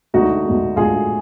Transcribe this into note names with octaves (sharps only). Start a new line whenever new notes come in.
D2 D3 G#3 D#4 F#4
D2 D3 G#3
D2 D3 G#3 F4 G#4